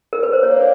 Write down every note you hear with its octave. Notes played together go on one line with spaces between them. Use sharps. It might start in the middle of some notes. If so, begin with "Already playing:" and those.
A#4
B4
C5
A#3 D4 C#5